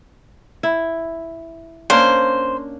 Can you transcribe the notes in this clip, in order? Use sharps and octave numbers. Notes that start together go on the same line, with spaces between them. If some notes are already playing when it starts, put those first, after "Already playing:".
E4
A#3 C#4 D4 C5